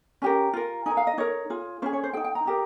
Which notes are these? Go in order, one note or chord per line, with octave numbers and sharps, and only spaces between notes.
C#4 G4 A#4 G#5
F4 A#4
D#4 A#4 G#5
F5
D#5
D#4 A#4 C#5
F4 G#4
C#4 G#4 C5
C#5
C5
G#4 G5
D#4
G5
A#5
D#4 G4 A#4